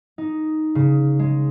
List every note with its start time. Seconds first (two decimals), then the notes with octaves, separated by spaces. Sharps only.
0.18 D#4
0.75 C#3
1.19 G#3